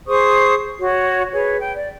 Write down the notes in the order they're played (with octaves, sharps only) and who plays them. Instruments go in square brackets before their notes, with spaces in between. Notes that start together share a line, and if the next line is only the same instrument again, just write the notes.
[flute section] G#4 C5 C#6 D#6
F#4 C#5
G#4 B4 C#5
G5
D5